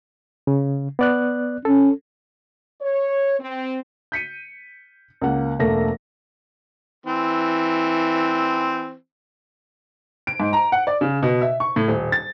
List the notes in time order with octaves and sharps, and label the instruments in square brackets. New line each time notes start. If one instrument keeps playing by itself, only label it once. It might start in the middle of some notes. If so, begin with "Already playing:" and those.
[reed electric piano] C#3
B3 D5 F#6
[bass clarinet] C#4 [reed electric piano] A4
[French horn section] C#5
C4
[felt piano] G6 B6 C#7 D#7
C#2 A#3 F#5
E1 A3 A#3 A4 A#6
[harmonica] E3 C4
[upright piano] D7
G#2
A#5
F#5
D5
C#3
B2
E5
C#6
A2
D#1
A6